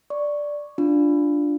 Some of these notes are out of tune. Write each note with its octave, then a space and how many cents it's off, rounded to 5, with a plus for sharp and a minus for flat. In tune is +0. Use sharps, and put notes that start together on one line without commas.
D5 +0 C#6 +0
D4 +0 F4 +0